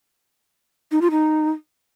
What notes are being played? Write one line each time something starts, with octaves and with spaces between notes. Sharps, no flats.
D#4
F4
D#4